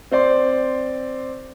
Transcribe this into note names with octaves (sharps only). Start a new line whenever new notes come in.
C4 C5 D5 C6